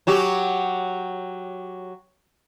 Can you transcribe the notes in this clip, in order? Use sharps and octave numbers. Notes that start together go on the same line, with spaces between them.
F#3 F#4 G4